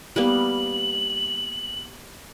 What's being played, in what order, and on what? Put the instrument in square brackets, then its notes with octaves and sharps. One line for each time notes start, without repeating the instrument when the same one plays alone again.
[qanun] G3 A#3 B3 [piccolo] F#7